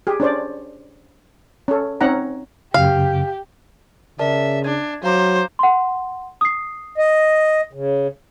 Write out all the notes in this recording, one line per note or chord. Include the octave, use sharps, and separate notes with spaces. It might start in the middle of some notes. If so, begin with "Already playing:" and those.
G4 G#4
C#4 D4 C5 D5
C#4 A4
C4 C#4 D#4 F#5 A#5
F#2 C#3 G4 F5
C#3 A#4 D5 E5 A5
D4 G#6
F#3 C5 F5 A#5 D6
F#5 C6
D#6 C7
D#5
C#3